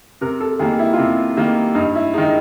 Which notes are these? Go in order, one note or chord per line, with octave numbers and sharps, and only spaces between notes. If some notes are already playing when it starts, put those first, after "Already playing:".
C3 A#4
A4
D#3 G3 A#3 G#4
E4
F4
C3 E4
D#3 G3 A#3
G2 D#4
E4
D#3 G#3 D#4